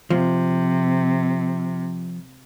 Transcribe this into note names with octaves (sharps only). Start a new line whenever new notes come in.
C3 F3